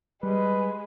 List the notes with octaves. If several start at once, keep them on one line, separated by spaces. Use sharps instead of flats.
G3 G#3 B4